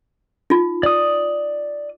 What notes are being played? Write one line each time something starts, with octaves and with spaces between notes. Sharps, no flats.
D#4 F4
D5 D#6